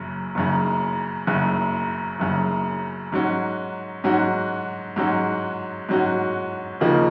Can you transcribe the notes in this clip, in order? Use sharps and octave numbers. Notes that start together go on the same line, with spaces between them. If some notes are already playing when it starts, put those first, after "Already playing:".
Already playing: F#1 F#2 C#3
F#1 F#2 C#3
F#1 F#2 C#3
F#1 F#2 C#3
G#2 F#3 C#4 F#4
G#2 F#3 C#4 F#4
G#2 F#3 C#4 F#4
G#2 F#3 C#4 F#4
D#2 C#3 F3 A#3 D#4